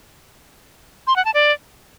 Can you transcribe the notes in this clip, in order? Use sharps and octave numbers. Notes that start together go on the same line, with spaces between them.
C6
F#5
A5
D5